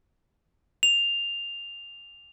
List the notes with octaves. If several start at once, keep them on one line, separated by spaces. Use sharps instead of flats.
F7